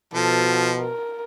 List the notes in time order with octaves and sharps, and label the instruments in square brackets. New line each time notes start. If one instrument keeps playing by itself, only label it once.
[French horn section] B2 [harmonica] F3 [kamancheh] A4
[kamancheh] A#4